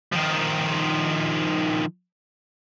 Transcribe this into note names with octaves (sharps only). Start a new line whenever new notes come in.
D#3 F3